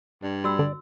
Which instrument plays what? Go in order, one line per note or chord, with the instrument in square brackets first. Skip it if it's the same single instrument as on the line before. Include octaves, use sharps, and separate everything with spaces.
[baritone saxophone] G2 [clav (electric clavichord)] D4
[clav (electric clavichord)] G3 [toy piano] F#4 E6
[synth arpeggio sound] D3 [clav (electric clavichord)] D5